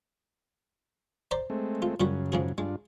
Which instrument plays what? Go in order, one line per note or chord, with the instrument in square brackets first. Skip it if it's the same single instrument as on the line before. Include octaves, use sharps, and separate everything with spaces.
[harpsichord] C5 D5 A#5
[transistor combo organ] G#3 A3 C4
[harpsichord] F4
[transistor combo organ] F#2 C#3 [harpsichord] A#2 G3 F#4
[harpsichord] G#2 F3 G#4
[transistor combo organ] G2 D4 F4 [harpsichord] G#3